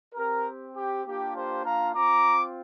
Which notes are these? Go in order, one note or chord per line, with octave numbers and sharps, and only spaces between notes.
C4 G4 A#4
G4
A#3 D4 F4 G4
G4 C5
F5 A#5
C4 F4 A#5 D6